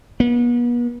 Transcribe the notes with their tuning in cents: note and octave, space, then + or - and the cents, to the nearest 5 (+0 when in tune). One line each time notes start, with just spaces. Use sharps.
B3 -40